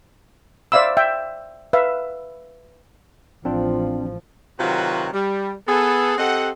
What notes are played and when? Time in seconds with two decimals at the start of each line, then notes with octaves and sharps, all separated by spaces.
0.72 C5 D5 E5 F5 B5 E6
0.97 E5 G5
1.73 B4 E5 F5
3.45 A1 F3 C4 D4 F4
4.60 C3 D#3 F#3 F4 F#4 B4
5.13 G3
5.68 B3 G#4 A4
6.18 C4 G4 A4 D#5 F#5